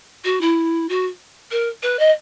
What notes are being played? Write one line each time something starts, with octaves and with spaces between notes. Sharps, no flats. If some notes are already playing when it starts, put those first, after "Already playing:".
F#4
E4
F#4
A#4
B4
D#5